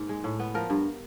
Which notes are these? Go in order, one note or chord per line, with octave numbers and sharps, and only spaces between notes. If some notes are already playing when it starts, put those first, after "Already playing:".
Already playing: G#2 A#3
G#3
A2
B3
F3 A#4
G2